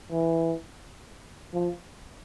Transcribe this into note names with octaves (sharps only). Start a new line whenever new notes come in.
E3
F3